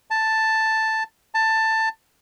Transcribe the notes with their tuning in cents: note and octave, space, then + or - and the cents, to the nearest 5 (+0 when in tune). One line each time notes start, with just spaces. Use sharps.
A5 +5
A5 +15